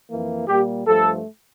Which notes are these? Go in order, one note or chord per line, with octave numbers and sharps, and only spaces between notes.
F2 E3 A#3
A#2 G3 A#3 G4
G2 F3 A3 A4